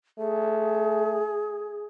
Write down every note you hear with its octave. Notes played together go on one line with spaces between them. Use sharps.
A3 G#4